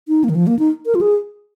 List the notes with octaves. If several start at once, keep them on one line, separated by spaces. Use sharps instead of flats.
D#4
A#3
D#3
F3
A#3
D#4
A#4
F4
G#4